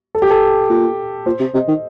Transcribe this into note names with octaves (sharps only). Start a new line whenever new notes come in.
A4
G4
A4
A#2
A#2 C5
C3
C3 D#5
D#3